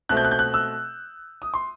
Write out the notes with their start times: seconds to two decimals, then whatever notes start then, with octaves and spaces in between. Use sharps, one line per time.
0.09 B2 A3 C4 F#6
0.17 G6
0.25 F#6
0.31 G6
0.39 F#6
0.54 E6
1.42 D#6
1.54 C6